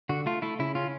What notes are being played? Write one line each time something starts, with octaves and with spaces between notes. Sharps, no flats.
D3 F#4
A3 F4
A3 E4
C#3 E4
C#4 F4